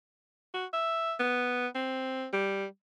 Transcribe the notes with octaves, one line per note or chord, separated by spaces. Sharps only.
F#4
E5
B3
C4
G3